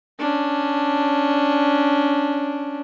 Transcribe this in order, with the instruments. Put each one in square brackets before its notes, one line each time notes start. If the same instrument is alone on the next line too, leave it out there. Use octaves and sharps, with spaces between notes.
[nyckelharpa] C#4 D4